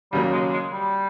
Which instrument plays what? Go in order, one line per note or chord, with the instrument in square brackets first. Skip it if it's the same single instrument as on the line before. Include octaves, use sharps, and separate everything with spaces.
[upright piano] D#2 C#3 F#3 A#3 [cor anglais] G3
[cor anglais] G#3
G#3
G3